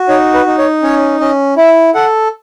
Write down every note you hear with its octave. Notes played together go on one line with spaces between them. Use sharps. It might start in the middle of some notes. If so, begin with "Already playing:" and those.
Already playing: F#4
D#4 C#5
B4
D#4
C#5
C#4 C#5
C#4 D#5
E4 E5
A4 F#5